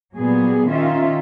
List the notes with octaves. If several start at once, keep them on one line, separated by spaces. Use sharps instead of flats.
A#2 F#3 G3 B3 G#4
D#3 C#4 F4 E5